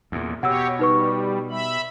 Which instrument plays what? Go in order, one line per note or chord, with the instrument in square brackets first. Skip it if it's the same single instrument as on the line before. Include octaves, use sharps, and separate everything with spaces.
[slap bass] E2 A#2
[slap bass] B2 [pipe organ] G4 C#5 [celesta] F#5 E6
[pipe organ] G3 [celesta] D#4 B4 C#6
[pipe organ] E5 B5